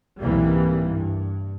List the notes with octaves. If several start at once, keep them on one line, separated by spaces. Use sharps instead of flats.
C2 G#2 C3 E3 G3 A#3
G2